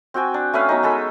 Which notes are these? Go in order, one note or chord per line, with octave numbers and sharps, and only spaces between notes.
C4 F#4 G5 G#5
D4
A3 C#4 B4 F5
F#3 B3 C#4 D#4
G#3 G#4 A4 B5